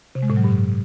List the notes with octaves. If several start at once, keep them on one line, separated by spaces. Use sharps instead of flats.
C3
G#3
A2
F#3
G2